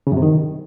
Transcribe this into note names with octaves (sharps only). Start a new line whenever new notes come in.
C#3
F#2
C3
D#3